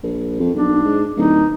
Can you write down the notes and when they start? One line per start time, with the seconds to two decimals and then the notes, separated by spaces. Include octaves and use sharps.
0.03 A#1
0.40 F2
0.55 B1 D4
0.84 G#2
1.17 D1 D#4